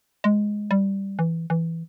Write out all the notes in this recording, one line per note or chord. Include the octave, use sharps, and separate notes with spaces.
G#3
G3
E3
E3